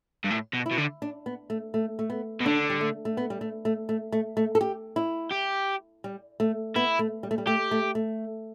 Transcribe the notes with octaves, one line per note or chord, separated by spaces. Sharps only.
G2
A2
B2
E4
B2
D3
D4
B3
A3
A3
A3
B3
B2
D3 D4
G3
A3
A3
B3
G3
A3
A3
A3
A3
A3
A4
G4
E4
G4
G3
A3
B3 E4
A3
G3
A3
G3
A3 G4
A3
A3